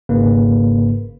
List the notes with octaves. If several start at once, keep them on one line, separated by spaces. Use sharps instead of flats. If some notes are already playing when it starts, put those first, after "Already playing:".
G#1 G#2 C#3 A#3 B4